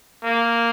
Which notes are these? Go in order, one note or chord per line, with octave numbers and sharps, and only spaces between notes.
A#3